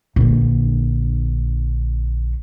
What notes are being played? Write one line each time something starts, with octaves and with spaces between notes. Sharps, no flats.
A#1 D3